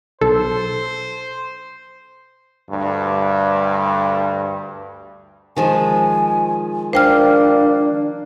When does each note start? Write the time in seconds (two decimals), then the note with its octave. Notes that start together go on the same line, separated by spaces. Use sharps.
0.21 B1 A4 C5
2.69 D2 G2
5.57 D#3 F3 G#3 G#5
6.93 A#3 D4 C5 G5 F6